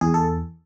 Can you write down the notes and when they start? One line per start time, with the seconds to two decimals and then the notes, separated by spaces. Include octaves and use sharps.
0.01 E2 G#4
0.14 A4